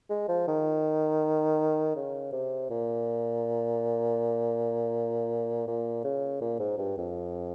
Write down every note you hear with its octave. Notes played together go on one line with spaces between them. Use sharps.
G#3
F3
D#3
C#3
C3
A#2
A#2
C#3
A#2
G#2
G2
F2